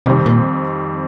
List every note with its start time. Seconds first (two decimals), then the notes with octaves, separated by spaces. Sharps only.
0.06 F2 C3 D#3 G3 C4 G4
0.26 A#2